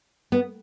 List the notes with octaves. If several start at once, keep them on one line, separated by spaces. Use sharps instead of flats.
B3